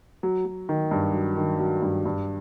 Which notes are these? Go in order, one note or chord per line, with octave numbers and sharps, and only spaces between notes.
F#3
F#3
D#3
G2
F#3
D#3
F#3
G2
G2